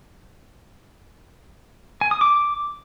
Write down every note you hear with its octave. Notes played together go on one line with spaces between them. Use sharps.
G#5
D#6
D6